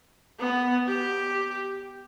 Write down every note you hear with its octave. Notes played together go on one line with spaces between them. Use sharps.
B3
G4